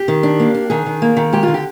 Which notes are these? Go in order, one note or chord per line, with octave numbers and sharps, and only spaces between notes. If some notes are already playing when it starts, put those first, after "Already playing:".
Already playing: G4
D#3
D4
A#3
D4
D#3 G#4
D#3
A#3
D#3
G#3 G4
F4
D3
G4